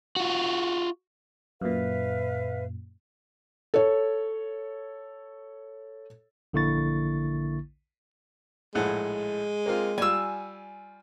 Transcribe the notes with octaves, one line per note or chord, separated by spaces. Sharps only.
F4 F#4
F#2 A#2 B4 E5 F5
A4 C#5
A#1 D3 A#3 E4 C#6 A6
A#1 A2 G#3 F#5
A#3 C4 F4
G3 F4 G#5 E6